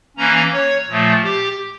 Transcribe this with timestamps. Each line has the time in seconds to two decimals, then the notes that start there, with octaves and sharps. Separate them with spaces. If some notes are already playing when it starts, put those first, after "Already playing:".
0.17 E3 A#3 C#4 A#5
0.53 C#5
0.88 A#2 F3 A3
1.24 G4